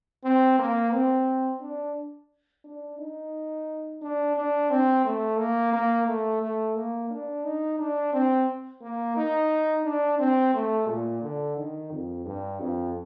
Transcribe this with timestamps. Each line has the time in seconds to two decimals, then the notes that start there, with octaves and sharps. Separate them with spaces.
0.24 C4
0.59 A#3
0.93 C4
1.61 D4
2.64 D4
2.99 D#4
4.02 D4
4.36 D4
4.70 C4
5.05 A3
5.38 A#3
5.73 A#3
6.07 A3
6.42 A3
6.76 A#3
7.10 D4
7.44 D#4
7.79 D4
8.13 C4
8.81 A#3
9.16 D#4
9.84 D4
10.19 C4
10.54 A3
10.87 A#2
11.22 D3
11.57 D#3
11.91 F2
12.26 G2
12.59 F2